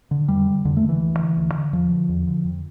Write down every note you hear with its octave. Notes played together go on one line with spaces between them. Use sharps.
D3
F2 G3
D3
F2 D3
A3
D3
E3
D2
D3
D2
D3
E2 F3
D3
E2
D3
F2